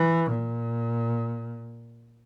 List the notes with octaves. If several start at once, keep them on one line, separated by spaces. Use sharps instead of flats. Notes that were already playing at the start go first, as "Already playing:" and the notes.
Already playing: E3
A#2